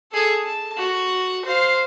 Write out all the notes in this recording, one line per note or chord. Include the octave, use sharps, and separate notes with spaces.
G#4 A4
A5
F#4
C5 F5